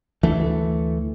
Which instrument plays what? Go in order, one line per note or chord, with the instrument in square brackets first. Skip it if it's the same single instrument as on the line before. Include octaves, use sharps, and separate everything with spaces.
[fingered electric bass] D2 E3 A3